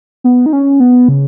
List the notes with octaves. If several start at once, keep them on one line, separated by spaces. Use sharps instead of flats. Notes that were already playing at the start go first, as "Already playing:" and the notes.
B3
D#4
C#4
B3
C#3